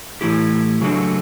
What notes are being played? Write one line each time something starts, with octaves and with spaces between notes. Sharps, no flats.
A2 E3 B3 E4 G4
C#3 F#3 A3 D4 F#4